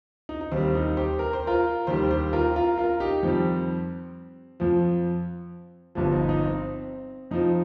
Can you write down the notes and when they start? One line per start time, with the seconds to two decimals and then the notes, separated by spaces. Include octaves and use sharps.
0.29 D#4
0.41 D#4
0.52 D#2 D#3 G3 C4
0.75 D#4
0.97 G4 C5
1.19 A#4
1.33 C5
1.47 F4 A#4
1.87 D#2 D#3 G3 G4 C5
2.11 G4 C5
2.33 F4 A#4
2.56 F4 A#4
2.78 F4 A#4
3.00 D#4 G4
3.23 F2 D#3 G3 C4
4.60 F2 F3
5.95 G1 G2 F3
6.13 D#4
6.29 D#4
6.45 C4
7.31 F2 F3 D#4